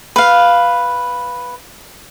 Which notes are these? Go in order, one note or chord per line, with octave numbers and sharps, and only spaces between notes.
B4 F5